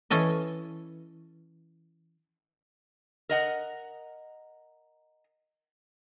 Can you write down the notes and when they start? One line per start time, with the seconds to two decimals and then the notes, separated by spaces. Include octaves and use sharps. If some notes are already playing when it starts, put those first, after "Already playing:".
0.10 E3 C#4 A4 D#5
3.29 A#4 D#5 F#5